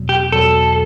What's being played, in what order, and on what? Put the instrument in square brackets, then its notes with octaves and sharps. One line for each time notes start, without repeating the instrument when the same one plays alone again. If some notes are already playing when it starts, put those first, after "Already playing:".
Already playing: [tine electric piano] E2 B2 F#3
[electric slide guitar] G4
[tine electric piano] E2 B2 F#3 [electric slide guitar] A4